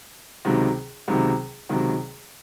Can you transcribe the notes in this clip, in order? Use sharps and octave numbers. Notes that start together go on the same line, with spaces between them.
C#2 C3 D#3 F#3
C#2 C3 D#3 F#3
C#2 C3 D#3 F#3